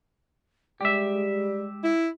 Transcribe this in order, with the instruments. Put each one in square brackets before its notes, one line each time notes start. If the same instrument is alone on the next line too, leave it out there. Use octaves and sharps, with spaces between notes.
[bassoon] G3 [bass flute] G#3 [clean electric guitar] G4 E5
[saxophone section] E4